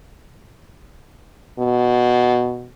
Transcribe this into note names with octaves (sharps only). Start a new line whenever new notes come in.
B2